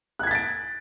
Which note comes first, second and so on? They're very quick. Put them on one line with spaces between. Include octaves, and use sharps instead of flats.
F#6 G#6 B6 A6 D7